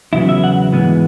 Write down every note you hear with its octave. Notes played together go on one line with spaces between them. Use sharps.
E2 C#3 F#3 B3 E4
E5
F#5
G#2 E3 G#3 B3